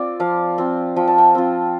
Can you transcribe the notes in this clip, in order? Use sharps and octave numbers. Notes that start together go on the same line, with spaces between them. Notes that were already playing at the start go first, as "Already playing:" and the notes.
Already playing: C4 F4 D5
F3 F5
C4 F4
F3 G5
A5
G5
C4 F4